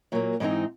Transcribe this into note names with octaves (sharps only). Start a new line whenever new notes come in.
A#2 F#3 A#3
G#2 E3 G#3 C4 D#4